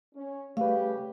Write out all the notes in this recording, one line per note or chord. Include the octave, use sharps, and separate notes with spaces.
C#4
C#3 G3 A3 G4 B4 F5